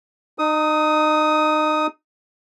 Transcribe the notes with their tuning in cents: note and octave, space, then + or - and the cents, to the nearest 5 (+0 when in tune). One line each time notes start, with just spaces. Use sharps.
D#4 -30 D#6 +10